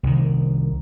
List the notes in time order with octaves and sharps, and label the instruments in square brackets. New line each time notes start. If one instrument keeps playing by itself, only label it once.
[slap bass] C2 D#3